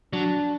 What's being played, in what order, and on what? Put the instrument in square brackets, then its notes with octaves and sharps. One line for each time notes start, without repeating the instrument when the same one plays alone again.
[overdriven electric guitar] F#3 [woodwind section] D4